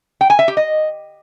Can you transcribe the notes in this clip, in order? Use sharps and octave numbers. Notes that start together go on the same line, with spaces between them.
G5
G#5
E5
G4
D#5